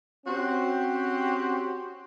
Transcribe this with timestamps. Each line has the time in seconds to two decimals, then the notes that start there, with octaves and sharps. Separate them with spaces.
0.26 C4 C#4 F#4 G4 C5